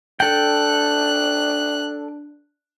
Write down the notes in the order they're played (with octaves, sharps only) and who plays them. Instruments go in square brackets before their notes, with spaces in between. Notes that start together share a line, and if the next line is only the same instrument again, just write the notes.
[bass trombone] D4 [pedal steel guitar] A4 G5 [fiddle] F#6